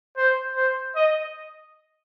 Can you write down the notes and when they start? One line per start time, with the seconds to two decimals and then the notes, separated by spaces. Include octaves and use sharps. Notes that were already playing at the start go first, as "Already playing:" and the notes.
0.17 C5
0.56 C5
0.96 D#5